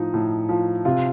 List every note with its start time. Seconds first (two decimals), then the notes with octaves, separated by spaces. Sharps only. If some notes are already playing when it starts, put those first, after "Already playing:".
Already playing: A2 F3 D#4
0.14 A2
0.49 F3
0.85 C3 F4